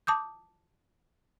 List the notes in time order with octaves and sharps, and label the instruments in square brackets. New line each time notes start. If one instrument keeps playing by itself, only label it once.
[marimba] A5 D6 D#6 G6